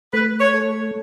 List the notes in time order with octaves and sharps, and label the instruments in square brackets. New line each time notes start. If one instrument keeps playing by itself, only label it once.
[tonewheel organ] A3 [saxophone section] B4
[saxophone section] C#5
[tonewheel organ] A4